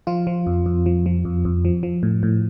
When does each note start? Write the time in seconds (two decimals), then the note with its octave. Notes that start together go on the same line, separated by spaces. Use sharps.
0.07 F3 F4
0.27 F3
0.47 F2
0.66 F2
0.86 F3
1.06 F3
1.25 F2
1.45 F2
1.65 F3
1.83 F3
2.03 A2
2.23 A2